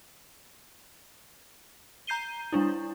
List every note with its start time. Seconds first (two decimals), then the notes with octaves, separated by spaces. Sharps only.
2.07 A#5 G6 C7 D#7 G7
2.52 G3 D4 E4